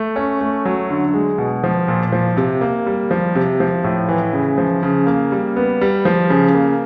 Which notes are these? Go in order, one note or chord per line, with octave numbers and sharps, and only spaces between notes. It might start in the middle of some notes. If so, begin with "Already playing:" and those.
Already playing: A3
C#4
A3
F#3
D3
G#3
B2
F3
A#2
F3
C3
A#3
G3
F3
C3
F3
A2
E3
C#3
F3
C#3
A#3
G3
B3
G3
F3
C#3
A#3